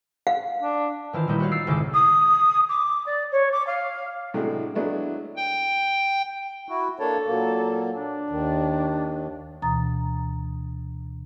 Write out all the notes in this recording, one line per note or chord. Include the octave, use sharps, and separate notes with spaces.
F5
D4
D#3 E3 F4 C5
A#2 D#3 G3 D#4 E4
D#4 F#4 C5 C#5 F5
E6 A6 C7 D7
G#1 C#2 C#3 D#4 A4 D6
D#6
D6
D5
C#5
D6
F5
A2 C3 F#3 G#3 A3 D4
F#3 G#3 A3 B3 D4 E4
G5
E4 F#4
A#3 D4 A4 C#5
A#2 F#3 A#3
D4
D#2 D#3
D2 B2 E3 A#5 D#6 A6